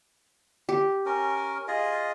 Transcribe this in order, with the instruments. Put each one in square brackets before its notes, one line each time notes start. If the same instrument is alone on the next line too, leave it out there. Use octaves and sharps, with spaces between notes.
[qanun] G4
[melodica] C#4 A#4
F4 G#4 D#5